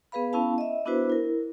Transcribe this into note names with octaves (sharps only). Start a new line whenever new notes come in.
B3 G#4 B4 F5 B5
B3 C#4 E4 F5 A5
D#5 E5
B3 D4 E4 F#4 B4 C5
E4 A#4